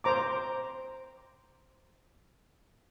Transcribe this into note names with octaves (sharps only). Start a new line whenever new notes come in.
C5 A#5 D6